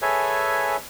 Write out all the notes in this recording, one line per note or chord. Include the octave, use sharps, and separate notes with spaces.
G#4 A4 B4 C#5 E5 G#5